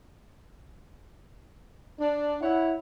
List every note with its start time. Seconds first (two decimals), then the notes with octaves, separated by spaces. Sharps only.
1.99 D4
2.42 E4 C#5 F#5